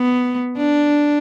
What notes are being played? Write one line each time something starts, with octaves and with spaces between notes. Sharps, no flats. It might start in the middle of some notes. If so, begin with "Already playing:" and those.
Already playing: B3
D4